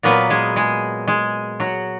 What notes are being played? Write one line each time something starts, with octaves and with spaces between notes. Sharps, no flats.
A#2 F#3 A#3 B3 B4
G#3 G#4
G#3 G#4
G#3 G#4
F#3 F#4